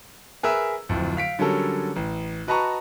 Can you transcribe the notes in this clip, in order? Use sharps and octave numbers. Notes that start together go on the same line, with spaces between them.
G#4 A#4 B4 E5 E6
D1 F2
F5 B6 D7
D3 F#3 G3 C#4 A4 A#4
A1
F#4 B4 D#5 A5 A#5 C#6